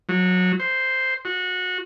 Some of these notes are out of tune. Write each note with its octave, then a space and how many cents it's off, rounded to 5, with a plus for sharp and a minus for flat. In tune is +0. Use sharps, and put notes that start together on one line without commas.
F#3 -20
C5 -5
F#4 -20